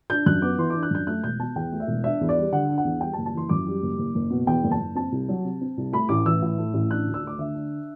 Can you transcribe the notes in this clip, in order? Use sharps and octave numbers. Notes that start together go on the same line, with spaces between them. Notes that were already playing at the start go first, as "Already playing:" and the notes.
D4 G6
F#2 F#6
B3 D6
E3 C6
D4 D6
F#6
F#2 G6
A3 F#6
E1 G6
B2 A5
E2 G5
A3
E5
E1
D4 E5
E2
D5
G3
D3 F#5
D4
F#5
E2
G3 G5
A5
F#1
A5
E3 C6
F#2 D6
G3
F#1
F#1
F#1
B2
E2 G5
F#1
A5
F#1
C4 A5
C2
F#3
C3
C4
C2
A3 B5
A1 D6
E3 E6
A2
A3
A1
D4 F#6
D2
E6
A3 D6
D3 E5
D4